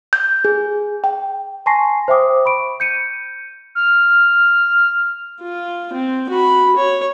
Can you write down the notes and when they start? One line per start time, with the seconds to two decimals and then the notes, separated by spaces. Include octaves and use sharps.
0.13 G6
0.45 G#4
1.04 G5
1.66 G#5 A5 C6 C#6 A#6 C7
2.08 C5 E5 G5 D6 D#6
2.45 B5 C#6 D7
2.80 G6 C#7 D#7
3.75 F6
5.42 F4
5.93 C4
6.29 F#4 B5
6.76 C#5